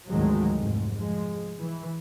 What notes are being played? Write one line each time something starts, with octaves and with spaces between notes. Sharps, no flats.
G#1 D2 D#3 F3 F#3 G#3
F1 G#2
F3 G#3
E3